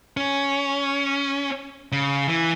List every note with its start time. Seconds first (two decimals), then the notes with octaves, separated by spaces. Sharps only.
0.17 C#4
1.92 C#3
2.28 E3